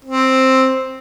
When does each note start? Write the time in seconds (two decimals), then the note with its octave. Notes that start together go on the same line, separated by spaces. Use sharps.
0.05 C4